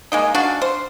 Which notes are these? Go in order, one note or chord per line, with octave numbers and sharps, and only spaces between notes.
G#3 A#3 D#4
D4 F#4 F5
C5